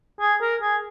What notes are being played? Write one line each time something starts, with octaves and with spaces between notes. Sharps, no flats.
G#4
A#4
G#4